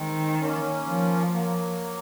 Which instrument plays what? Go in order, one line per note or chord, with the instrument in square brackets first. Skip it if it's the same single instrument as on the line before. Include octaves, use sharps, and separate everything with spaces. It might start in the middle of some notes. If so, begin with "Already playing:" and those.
Already playing: [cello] D#3 [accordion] G#3 C4
[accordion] A#3 C#4
[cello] F3
[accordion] F#3 A#3